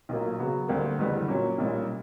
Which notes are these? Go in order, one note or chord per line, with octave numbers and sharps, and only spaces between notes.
B1 A#2 F#3 A#3
C#3 F#3 B3
D2 D3 G3 A#3
F#1 E2 D3 G3 B3
A#2 F#3 C#4
B1 A#2 G3 C#4